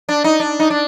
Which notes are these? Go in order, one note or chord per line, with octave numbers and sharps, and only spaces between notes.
D4
D#4
D4
D#4
D4